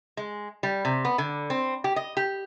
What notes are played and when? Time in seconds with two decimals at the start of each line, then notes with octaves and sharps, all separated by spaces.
0.17 G#3
0.63 G3
0.85 C3
1.05 B3
1.18 D3
1.50 C4
1.84 G4
1.96 D#5
2.17 G4